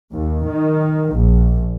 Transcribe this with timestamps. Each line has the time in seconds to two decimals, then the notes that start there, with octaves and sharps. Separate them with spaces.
0.12 D#2
0.45 D#3
1.14 A#1